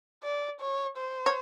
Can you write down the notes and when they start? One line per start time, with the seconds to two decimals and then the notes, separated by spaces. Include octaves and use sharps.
0.23 D5
0.61 C#5
0.97 C5
1.26 C#5